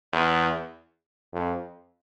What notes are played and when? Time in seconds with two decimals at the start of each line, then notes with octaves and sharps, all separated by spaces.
0.13 E2
1.33 F2